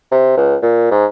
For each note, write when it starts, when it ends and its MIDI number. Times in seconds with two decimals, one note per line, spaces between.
0.12 0.36 48
0.38 0.56 37
0.62 0.90 46
0.91 1.06 44